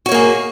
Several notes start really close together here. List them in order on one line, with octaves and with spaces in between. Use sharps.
F#4 C#5 A#3 G#4